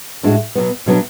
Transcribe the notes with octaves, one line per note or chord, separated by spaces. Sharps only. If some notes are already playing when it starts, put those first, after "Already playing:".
A2 G#3 D4 F#4
B2 F#3 B3
B2 F#3 B3 D4